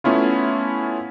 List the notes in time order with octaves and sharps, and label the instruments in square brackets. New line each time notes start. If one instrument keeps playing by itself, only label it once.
[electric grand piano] A3 B3 C#4 E4 F4